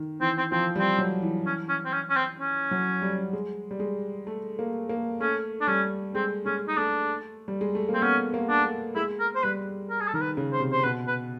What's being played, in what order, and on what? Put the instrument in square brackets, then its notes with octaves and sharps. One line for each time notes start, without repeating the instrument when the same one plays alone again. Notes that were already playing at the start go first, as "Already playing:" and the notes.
Already playing: [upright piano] D#3
[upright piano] E3 [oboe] C4
[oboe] C4
[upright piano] F3 [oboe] C4
[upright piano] G3
[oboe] C4
[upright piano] F#3
E3
[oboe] C#4
C#4
C4
C#4
C#4
C4
C#4
[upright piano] F#3
G3
G#3
G3
G#3
A3
A#3
A#3
[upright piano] A3 [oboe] C#4
[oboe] D4
[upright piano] G3 [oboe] C#4
[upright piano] G#3 [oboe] C4
[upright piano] G#3 [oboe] C#4
[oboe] D#4
[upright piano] A3 [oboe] D4
[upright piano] G3
G#3
A3
A#3
[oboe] C4
[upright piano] B3 [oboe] C#4
[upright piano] A#3
[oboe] D4
[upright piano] A3
[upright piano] G#3 [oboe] E4
[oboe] A#4
C5
[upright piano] G3 [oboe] B4
[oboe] A#4
G#4
A4
[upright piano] D#3 [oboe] A#4
[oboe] B4
[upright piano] C#3
[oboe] C5
[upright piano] C3
[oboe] C5
[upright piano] B2 [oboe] B4
[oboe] B4